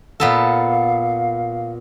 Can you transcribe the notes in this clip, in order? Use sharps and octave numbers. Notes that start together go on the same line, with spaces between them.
A#2 B3 A4 F5